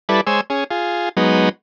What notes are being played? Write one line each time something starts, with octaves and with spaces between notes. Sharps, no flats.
G3 E4 A4 B4 D5
G#3 C5 C#5 G#5 E6
C#4 G#4
F4 G#4
F#3 G#3 B3 D#4